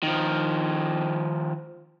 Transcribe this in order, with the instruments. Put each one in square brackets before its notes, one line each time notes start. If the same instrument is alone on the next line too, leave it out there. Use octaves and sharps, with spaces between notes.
[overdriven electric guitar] D#3 F3